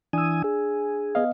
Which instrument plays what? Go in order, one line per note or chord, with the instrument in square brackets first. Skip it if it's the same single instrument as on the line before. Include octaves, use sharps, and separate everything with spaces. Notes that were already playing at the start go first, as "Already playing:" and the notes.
[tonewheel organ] E3 G#5 D#6 [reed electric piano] D4 E6
[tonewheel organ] G#4
[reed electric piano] B3 D#5 F5